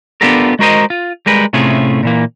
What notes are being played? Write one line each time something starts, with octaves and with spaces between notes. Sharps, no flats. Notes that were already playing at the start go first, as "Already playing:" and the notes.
B3 D4 F4 G4 A4 A#4
G#3 F#4 A#4 C5 D#5
F4
G3 G#3 A#4 B4
A2 C3 A3 C#4 F4 G#4
A#2 E3 A#3